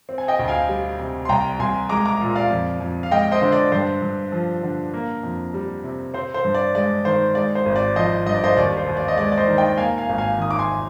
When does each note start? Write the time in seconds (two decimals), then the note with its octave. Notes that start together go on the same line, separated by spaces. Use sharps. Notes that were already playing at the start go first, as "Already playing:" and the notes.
0.09 C4
0.18 G#5
0.28 D#5 G5
0.39 D2
0.48 F5 G#5
0.68 G3
1.00 C3
1.25 C6
1.29 C2 G5 A#5
1.59 C2 G#5 C6
1.89 G#3 A#5 D6
2.05 A#5 D6
2.21 A#2
2.35 D5 F5
2.51 F2
2.80 F2
3.03 F5
3.11 G#3 D#5 G5
3.32 C5 D#5
3.42 D3 C5
3.52 D5
3.72 G2 C5
4.02 G2
4.32 F3
4.63 D3
4.94 A#3
5.23 F2
5.54 G3
5.84 C3
6.14 C4 C5
6.34 C5
6.44 G2
6.55 D5
6.75 G#3 D5
7.05 D#3 C5
7.35 G#3 D5
7.55 C5
7.66 G#1
7.76 D5
7.96 F3 C5 D#5
8.26 G2 D#5
8.35 D5
8.44 C5 D#5
8.57 D#2 D5
8.77 C5
8.87 D#2
8.97 D5
9.08 D#5
9.18 G#3 D5
9.32 D5
9.37 C5 D#5
9.48 D#3
9.58 D#5 G5
9.77 A#3 F5 G#5
9.98 F5 G#5
10.09 G#1
10.18 F5 G#5
10.38 D#3 D#6
10.51 D6
10.59 G#5 C6